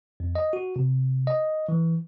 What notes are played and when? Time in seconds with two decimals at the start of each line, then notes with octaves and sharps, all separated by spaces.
0.20 F2
0.35 D#5
0.53 F#4
0.76 C3
1.27 D#5
1.69 E3